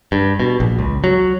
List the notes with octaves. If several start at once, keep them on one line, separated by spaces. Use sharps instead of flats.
G2
B2
A#1
C#2
F#3